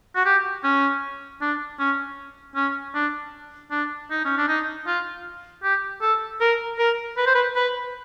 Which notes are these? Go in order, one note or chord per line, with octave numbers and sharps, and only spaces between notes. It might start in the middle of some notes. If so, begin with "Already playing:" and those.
F#4
G4
C#4
D4
C#4
C#4
D4
D4
D#4
C#4
D4
D#4
F4
G4
A4
A#4
A#4
B4
C5
B4
B4